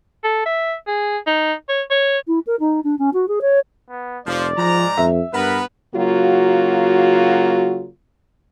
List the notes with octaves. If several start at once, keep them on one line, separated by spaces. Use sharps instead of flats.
A4
E5
G#4
D#4
C#5
C#5
E4
A#4
D#4
D4
C#4
F#4
G#4
C#5
B3
F1 F3 D5
G#2 F3 A#5
F2 E5
G2 B3 A#4 B4
C#3 F#3 A#3 F4 F#4